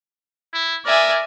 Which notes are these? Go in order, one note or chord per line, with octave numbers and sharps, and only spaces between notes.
E4
A#4 D5 E5 G#5